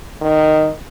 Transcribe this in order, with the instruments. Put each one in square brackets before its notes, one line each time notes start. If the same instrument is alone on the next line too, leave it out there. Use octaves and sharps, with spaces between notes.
[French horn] D#3